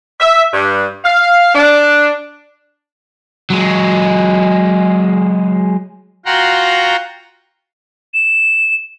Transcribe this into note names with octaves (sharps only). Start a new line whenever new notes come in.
E5
G2
F5
D4
F#3 G#3
F4 F#4 F#5 G5 A#5 C6
E7